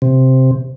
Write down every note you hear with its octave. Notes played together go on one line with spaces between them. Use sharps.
C3